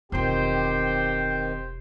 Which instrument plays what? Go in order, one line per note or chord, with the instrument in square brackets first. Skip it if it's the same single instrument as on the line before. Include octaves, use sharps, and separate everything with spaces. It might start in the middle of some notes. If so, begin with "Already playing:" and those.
[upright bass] E1 F4 [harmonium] D#3 C4 [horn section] G4 C5